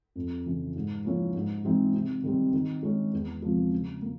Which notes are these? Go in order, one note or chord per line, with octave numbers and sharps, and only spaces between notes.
F2
C#3 E3
G#2
F3 A#3 C#4 E4
G#2
E3 G#3 C4 D#4
C3
D#3 G3 C4
D#3
G#3 C#4
E2
C3 F3 G#3
C#3
A#3